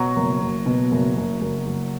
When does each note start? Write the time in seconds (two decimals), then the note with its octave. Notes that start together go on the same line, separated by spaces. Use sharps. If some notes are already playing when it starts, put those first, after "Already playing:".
Already playing: B2 F#3
0.16 F#1
0.41 F#1
0.66 B2
0.91 F#1
1.17 F#1
1.41 F#1
1.67 F#1